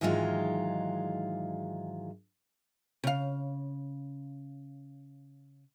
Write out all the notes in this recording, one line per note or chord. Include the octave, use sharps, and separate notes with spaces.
G#2 D#3 E3 F#3 G#3 F4
C#3 F5